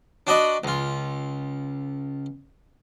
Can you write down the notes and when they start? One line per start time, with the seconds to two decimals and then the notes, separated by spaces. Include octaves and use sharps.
0.27 D4 F#4 D5 D#5 B5
0.64 C#2 F4